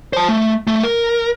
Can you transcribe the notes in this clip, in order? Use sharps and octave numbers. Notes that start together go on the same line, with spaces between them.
C5 A5
A3
A3
A#4